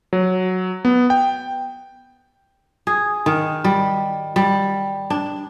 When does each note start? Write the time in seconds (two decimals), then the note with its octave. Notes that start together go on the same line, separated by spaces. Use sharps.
0.13 F#3
0.85 B3
1.10 G5
2.87 G#4
3.26 D#3
3.64 G3
4.36 G3
5.10 D4